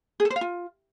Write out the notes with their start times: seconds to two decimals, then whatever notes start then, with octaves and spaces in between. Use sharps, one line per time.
0.20 G#4
0.25 A4
0.30 C5
0.36 F5
0.41 F4